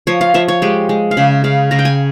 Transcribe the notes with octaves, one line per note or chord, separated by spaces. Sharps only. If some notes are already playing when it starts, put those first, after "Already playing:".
F3 C#5
F5
F3 E5
C#5
G#3 G4
G#3
F5
C#3 E5
C#3 F5
C#3 A#5
G5
G#5